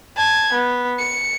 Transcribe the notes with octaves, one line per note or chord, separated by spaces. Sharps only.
A5 G#6
B3
C#7